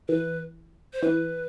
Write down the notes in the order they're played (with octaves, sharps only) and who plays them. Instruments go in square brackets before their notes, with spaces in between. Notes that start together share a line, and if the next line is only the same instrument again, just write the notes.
[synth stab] E3 [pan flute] B4
[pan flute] C5
[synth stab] E3 [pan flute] B4